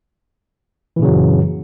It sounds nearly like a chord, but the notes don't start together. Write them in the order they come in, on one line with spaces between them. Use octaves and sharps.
E3 A#2 C#3 F#3 F#2